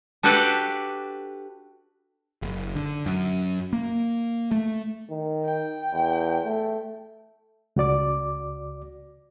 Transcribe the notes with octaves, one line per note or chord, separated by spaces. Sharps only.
D4 F#4 G4 A4 B4 D5
F#1
D3
F#2
A#3
A3
D#3
G5
E2
A3
C#2 F#4 D5 D6